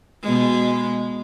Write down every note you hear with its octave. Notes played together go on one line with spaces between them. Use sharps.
B2 G#3